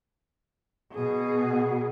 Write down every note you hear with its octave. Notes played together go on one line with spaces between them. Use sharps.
B2 G#4